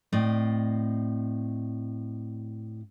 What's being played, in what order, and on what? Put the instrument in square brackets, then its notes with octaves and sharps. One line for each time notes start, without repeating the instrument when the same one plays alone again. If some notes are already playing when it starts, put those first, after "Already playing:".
[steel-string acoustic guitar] A2 C4 D5 D#5